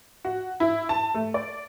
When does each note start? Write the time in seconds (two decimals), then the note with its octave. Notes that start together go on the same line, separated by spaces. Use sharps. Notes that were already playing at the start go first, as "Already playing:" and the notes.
0.25 F#4
0.60 E4
0.89 A5
1.14 A3
1.34 D5